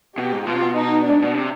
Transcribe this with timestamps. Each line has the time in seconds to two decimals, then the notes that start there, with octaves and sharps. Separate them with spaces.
0.18 B2 G4
0.32 G#2
0.47 B2 F4
0.55 C3
0.62 B2
0.76 D#4
1.05 D4
1.10 G#2
1.22 B2
1.34 C3